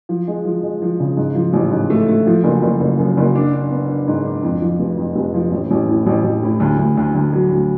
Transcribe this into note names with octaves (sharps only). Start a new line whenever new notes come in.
F3
G#3
F3
G#3
F3
C#3
G#2
F3
A1
G#2
A3
A3
F3
F#1
F#1
F#1
F#2
F#1
D4
D4
B3
D4
G#2
D4
F2
F3
F1
F2
F1
F3
A1
A1
A2
A1
A1
A2
D2
D2
D2
D2
F#3
D2